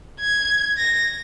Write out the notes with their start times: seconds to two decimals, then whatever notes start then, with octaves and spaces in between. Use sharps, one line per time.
0.20 G#6
0.78 A#6